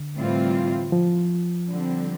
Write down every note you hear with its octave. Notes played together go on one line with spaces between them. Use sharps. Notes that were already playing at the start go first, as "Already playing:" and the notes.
Already playing: D3
A2 E3 G3 C4 F4
F3
D3 G3 C4